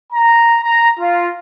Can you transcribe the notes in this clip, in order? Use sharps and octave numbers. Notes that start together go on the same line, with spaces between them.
A#5
A#5
F4